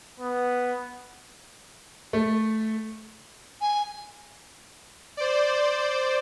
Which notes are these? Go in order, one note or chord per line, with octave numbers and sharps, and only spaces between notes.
B3
A3
G#5
C5 D5